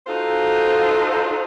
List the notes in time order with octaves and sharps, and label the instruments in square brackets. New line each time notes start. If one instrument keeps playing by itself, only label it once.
[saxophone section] D#4 F4 F#4 A4 C5